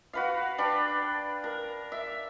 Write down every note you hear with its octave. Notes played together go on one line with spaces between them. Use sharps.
F#4 B4 F5
D4 B4 G5
A#4
E5